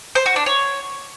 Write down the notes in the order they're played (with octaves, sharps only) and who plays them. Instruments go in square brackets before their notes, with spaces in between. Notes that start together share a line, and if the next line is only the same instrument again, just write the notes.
[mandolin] C5
F#4
D4
C#5